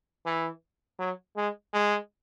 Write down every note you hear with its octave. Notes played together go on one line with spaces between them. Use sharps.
E3
F#3
G#3
G#3